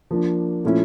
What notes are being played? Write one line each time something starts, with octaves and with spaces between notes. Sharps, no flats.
F3 A#3 D4
A#2 F3 A3 C#4 E4